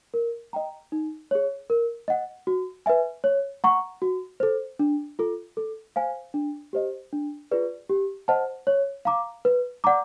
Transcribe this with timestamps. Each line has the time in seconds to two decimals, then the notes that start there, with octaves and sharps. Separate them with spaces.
0.14 A#4
0.53 D#5 G5 A#5
0.92 D#4
1.31 G#4 C#5
1.70 A#4
2.08 D#5 F#5
2.47 F#4
2.86 B4 E5 G#5
3.24 C#5
3.64 F#5 A#5 C#6
4.02 F#4
4.40 A4 C5
4.79 D4
5.19 F4 A4
5.57 A4
5.96 C5 F5 G#5
6.34 D4
6.73 G4 C5 D#5
7.13 D4
7.51 F4 G#4 B4 D5
7.90 G4
8.28 C5 D#5 F#5 A5
8.67 C#5
9.05 F5 A#5 D6
9.45 B4
9.84 D5 F#5 A#5 D6